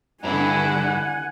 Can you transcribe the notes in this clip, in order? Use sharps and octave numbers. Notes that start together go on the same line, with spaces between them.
G2 D3 E4 F#5 G#5